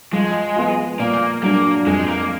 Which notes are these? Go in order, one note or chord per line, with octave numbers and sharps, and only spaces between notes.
F3 G#3
B3 F4
A#2 A#3
F#3 A#3 D4
F2 G#3
A#3